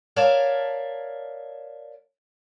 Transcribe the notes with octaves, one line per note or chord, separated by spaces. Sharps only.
A#4 C#5 D5 E5 F5 A5